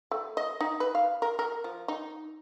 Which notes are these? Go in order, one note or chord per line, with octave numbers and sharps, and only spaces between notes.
A3
D#5
D#4
B4
F5
A#4
A#4
F3
D#4